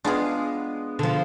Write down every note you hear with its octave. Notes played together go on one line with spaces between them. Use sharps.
G#3 B3 D4 F4 G#4
D3 F3